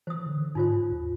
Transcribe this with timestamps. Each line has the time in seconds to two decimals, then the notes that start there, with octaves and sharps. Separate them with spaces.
0.07 E3 C5 D#6
0.26 D3
0.55 G#2 D#4 F4 C5
0.92 D#2